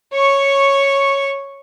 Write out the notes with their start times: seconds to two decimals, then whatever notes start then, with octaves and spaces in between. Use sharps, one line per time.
0.14 C#5 C#6